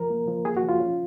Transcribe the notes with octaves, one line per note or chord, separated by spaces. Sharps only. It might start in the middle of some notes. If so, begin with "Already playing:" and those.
Already playing: F3 A#4
A#3
F3
A#3 G#4
F#4
F3
F4
C#4